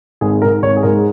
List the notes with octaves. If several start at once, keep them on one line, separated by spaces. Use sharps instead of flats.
G#1 G#4
G#2 G#3 A#4
G#1 C#5
G#4
G#2 G#3 A#4